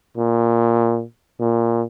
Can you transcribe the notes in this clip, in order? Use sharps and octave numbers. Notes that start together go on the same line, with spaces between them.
A#2
A#2